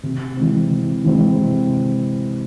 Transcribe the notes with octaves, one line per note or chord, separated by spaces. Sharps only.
C3
E3 G#3 C4
C3
E3 G#3 C4
C3